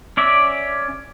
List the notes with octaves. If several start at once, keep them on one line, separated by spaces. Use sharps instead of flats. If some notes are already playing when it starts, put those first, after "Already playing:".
C#4 D5 E5